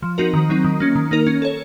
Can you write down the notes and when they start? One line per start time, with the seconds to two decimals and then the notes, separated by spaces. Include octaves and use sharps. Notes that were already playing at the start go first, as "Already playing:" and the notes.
0.02 F3
0.18 C4 D#4 F#4 A#4
0.34 D#3
0.49 F#3 C4 D#4
0.64 D#3
0.80 A#3 C#4
0.95 D#3
1.11 A#3 D#4 A#4
1.27 C#4
1.42 A4 C#5